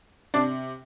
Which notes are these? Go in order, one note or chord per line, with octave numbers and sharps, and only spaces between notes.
C3 D4 D5